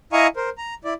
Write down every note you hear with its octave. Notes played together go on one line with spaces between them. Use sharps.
E4 D#5 F5 G#5 A#5 C#6
A#4 C5
A#5
E4 D5